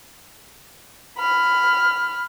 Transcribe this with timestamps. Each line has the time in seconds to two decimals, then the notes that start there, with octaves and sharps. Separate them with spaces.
1.19 B5 F6